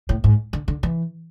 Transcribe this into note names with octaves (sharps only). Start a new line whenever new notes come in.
A2
G#2
D3
D3
E3